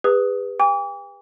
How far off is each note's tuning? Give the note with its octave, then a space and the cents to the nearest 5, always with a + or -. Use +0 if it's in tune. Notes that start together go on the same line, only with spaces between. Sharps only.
G#4 -45 B4 +0 D#6 +15
G5 +45 D6 -40